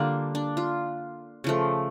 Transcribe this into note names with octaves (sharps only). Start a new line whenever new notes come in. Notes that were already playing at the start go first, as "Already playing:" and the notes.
Already playing: D3 G3 A#3 D4 F4
D4
F4
C#3 F3 A3